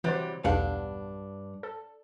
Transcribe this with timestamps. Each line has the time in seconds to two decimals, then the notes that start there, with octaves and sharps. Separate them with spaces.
0.04 C3 E3 F#3 G3 C5
0.45 B1 E2 G2 D4 F5 F#5
1.63 A4